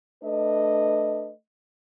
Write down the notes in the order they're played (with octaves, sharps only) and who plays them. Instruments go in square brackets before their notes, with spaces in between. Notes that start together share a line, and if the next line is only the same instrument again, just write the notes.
[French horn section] A3 D4 B4 D#5